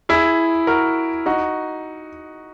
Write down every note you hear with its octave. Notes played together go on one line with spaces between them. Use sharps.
E4 G#4
F#4 A#4
D#4 F#4